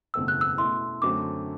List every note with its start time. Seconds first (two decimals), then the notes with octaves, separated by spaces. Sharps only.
0.14 F#1 E2 B2 A3 C4 E6
0.28 F#6
0.41 E6
0.58 B2 A3 E4 C6
1.02 F#2 D3 A3 C4 F#4 D6